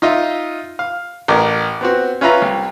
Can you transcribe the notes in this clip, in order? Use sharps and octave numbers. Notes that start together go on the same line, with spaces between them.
D#4 F4 D#5 E5
F5
A1 A#4
B3 C4 F#4
C#4 F4 B4 E5 A#5
C2